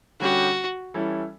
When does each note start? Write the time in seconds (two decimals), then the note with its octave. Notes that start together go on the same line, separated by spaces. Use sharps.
0.20 D3 G3 C#4 F#4 G4
0.94 E3 G3 C#4 E4 A4